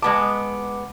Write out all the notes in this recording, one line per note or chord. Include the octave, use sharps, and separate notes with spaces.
G#3 B3 A5 D6